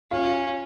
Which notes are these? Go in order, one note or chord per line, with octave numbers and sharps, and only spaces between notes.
C#4 F4